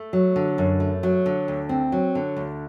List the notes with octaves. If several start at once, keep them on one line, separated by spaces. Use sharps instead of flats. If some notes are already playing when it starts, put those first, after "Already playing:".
Already playing: A3
F#3
D3
F#2
A3
F#3
D3
D2
C4
F#3
D3
D2